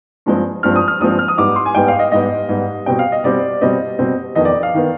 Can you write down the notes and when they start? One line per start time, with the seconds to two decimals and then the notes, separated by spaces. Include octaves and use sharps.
0.26 G2 F3 G#3 C4
0.63 G2 F3 G#3 C4 F6
0.76 D#6
0.88 F6
1.00 G2 F3 G#3 C4 D#6
1.19 F6
1.28 D#6
1.38 G#2 G3 B3 D6
1.56 C6
1.66 G#5
1.75 G#2 G3 B3 G5
1.88 F5
1.99 D#5
2.12 G#2 G3 B3 D#5
2.49 G#2 G3 B3
2.86 B2 G3 C4 G5
2.99 F5
3.12 D#5
3.24 B2 G3 C4 D5
3.61 B2 G3 C4 D#5
3.99 B2 G3 C4
4.35 F2 D#3 B3 D#5
4.45 D5
4.63 F5
4.75 D#3 B3